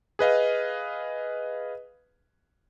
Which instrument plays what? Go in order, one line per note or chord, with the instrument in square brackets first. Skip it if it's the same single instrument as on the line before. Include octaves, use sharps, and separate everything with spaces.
[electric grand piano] G#4 B4 D#5 F5